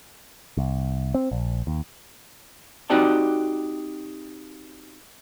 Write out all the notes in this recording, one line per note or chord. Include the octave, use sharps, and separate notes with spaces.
C2
C4
A#1
D#2
C4 D#4 F#4 G4 D5 A5